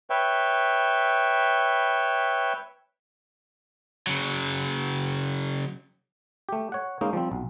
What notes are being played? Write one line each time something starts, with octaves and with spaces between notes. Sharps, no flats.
B4 C#5 E5 G5
C#3 F#3
A3 G4
C#5 F#5
G#3 A#3 C#4 D#4
F3 G3 C4
B1